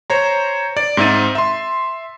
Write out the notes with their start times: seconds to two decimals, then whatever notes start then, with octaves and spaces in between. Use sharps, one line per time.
0.10 C5 C#5 A#5
0.77 D5
0.97 G#2 C4 D#4 E5 A6 D#7
1.35 E5 C6